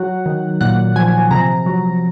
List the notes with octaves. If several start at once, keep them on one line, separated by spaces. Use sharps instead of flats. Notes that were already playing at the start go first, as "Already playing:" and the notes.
Already playing: F#3 F#5
D#3
A#2 F#5
F3 G#5
C3 A#5
F#3